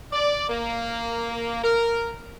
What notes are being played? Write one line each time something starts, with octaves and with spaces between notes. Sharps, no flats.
D5
A#3
A#4